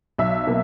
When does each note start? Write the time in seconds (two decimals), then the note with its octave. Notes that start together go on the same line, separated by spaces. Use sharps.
0.18 B1 E5
0.47 B2 A#3